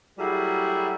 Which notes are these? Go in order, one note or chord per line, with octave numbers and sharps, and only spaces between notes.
F#3 G3 A3 E4 F#4 G#4